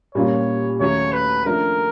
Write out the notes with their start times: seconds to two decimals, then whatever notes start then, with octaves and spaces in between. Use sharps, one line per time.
0.15 A#2 G3 A#3 C#4 F4 C#5
0.80 D#2 C#3 F#3 A3 C#5
1.12 B4
1.45 C#3 F3 A3 D4 A#4